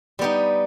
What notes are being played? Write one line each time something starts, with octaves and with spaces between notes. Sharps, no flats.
G3 B3 D#4 G4